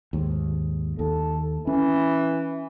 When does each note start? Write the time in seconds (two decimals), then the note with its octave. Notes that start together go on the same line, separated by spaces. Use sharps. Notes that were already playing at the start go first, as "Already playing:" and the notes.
0.13 D#2 G#2
0.99 D#2 A4
1.67 E3 C#4